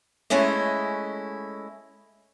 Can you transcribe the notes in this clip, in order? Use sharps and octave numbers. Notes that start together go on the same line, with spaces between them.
G#3 A3 C#4 E4 D#5